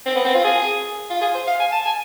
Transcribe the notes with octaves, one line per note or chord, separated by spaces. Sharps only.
C4
B3
C4
F4
G#4
F4
G#4
C5
F5
G#5
A5
G#5